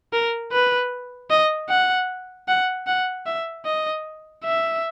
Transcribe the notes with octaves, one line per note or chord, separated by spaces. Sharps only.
A#4
B4
D#5
F#5
F#5
F#5
E5
D#5
E5